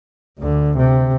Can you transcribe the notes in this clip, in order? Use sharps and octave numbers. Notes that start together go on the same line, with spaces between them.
D2 D3
C3